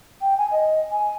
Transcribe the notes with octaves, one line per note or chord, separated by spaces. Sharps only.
G5
G#5
D#5
G#5